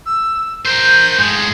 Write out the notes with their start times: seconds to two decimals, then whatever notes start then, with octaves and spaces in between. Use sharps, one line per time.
0.06 E6
0.65 A#4 C5 G6
1.18 A2 G#3